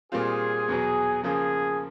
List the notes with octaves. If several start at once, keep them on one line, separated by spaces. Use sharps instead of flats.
A#2 G3 C4 F4 G#4
E2 B2 F#3
C#3 F3 A#3 G#4